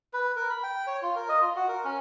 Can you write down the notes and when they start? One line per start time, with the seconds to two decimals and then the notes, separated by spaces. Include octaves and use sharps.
0.13 B4
0.36 A#4
0.50 B5
0.63 G5
0.87 C#5
1.02 F4
1.16 A#4
1.29 D#5
1.41 F4
1.56 F#4
1.68 A#4
1.85 C#4